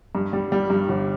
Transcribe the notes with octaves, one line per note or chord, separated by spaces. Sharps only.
G2
G3
G3
G2
G1